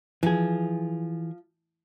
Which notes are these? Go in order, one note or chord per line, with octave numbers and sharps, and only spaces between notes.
E3 F3 G#4